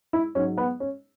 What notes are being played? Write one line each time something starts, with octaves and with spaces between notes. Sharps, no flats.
E4
G#2 F#3 C#4
B3
C#4